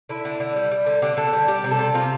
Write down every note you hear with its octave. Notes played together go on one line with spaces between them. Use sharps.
D3 E4
D3
D3
G3
G3
D3
D3 G4
D3 A4
G3
G3 G4
C3
A4
C3
C3 F4